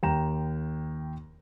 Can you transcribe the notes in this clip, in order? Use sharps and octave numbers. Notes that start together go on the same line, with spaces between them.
D#2 G5 A#5 E7